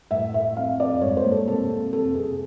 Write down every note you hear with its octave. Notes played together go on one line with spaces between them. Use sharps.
A2 E5
A2 E5
F2 F5
F2 D5
G#2 C#5
C5
A#3
A4
C3 A4
F2
F2 A4
C3 G#4